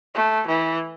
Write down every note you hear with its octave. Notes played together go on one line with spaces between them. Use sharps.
A3
E3